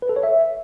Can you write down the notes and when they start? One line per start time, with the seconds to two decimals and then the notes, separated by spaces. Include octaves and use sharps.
0.02 B4
0.09 A4
0.16 C#5
0.23 E5